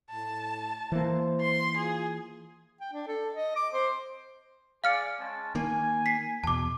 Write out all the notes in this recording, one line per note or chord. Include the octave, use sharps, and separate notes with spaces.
A2 A5
E3 A#3 C5
C6
F4 G#4
G5
D4
A4
D#5
D6
C5
G#4 D5 F5 F6 C#7
G#3 C#4 A5
D#3 A#3 G#5
B6 C7
E2 B2 A5 D6